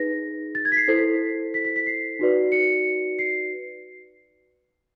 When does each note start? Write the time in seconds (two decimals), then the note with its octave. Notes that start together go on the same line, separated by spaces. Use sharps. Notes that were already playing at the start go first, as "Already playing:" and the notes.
Already playing: D#4 G#4 B4 A#6
0.55 A6
0.65 G#6
0.72 B6
0.77 C7
0.88 E4 A4 C5
1.54 B6
1.65 B6
1.76 B6
1.87 C7
2.19 D#4 F#4 B4 D5
2.52 C#7
3.19 C7